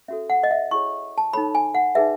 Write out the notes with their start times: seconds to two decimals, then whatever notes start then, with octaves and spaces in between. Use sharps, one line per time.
0.08 C#4 F#4 A4 E5
0.30 F#5
0.43 D#5
0.51 E5
0.71 E4 G#4 C#5 C#6
1.18 A5
1.33 D#4 A4 C#5 B5
1.55 G#5
1.75 F#5
1.95 D#4 G#4 B4 E5